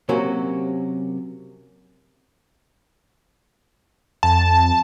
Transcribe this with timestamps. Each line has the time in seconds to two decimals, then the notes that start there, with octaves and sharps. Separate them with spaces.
0.09 C3 F#3 A#3 C#4 F#4
4.23 F2 A5